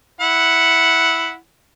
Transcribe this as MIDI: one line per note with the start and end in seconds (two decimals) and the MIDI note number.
0.21 1.35 64
0.21 1.35 78